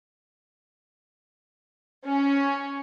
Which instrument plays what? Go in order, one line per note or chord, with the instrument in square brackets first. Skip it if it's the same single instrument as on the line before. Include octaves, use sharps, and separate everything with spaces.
[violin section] C#4